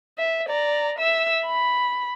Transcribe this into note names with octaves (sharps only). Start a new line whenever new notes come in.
E5
D5 A#5
E5 E6
B5